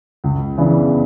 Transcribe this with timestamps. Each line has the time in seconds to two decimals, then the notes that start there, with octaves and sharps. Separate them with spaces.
0.24 C#2
0.58 C#3 E3 B3 D4